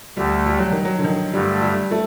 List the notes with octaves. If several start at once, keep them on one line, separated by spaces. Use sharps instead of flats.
D2 D3 G3 A3
G3
F#3
D#3
F#3
D3
D#3
G2 D3 G3 A3
G3
A3